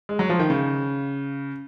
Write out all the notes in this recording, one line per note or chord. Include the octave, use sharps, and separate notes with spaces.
G#3
F#3
F3
D#3
C#3